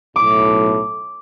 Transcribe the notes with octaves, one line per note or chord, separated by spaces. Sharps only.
B1 A2 D6